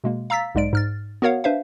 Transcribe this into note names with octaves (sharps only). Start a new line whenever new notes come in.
B2 G#3 A#3
F5 A#5 E6 A6 B6
B1 G#2 G#3 D5 D7
G#2 F6 A6
B3 F#4 A#4 C#5 F5 F#5
D4 B4 C5 E5 F5